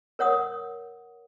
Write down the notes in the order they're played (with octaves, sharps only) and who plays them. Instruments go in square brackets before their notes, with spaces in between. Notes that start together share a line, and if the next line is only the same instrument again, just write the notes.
[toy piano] A#4 C#5 F#5 D#6